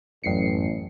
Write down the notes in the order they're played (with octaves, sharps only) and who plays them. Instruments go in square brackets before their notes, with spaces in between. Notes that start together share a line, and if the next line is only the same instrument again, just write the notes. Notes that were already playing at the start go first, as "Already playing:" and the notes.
[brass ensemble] A1 [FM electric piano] F#2 C7 C#7